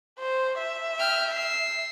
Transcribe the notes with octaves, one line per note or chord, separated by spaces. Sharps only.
C5
E5
G5 F6
E6 C7